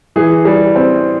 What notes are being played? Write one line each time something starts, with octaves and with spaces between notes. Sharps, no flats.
E3 G#4
G3
C4